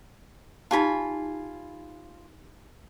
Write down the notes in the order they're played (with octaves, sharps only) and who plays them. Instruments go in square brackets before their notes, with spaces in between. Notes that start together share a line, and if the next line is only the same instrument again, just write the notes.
[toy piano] D#4 G4 A5 [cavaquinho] F4 G#5 B5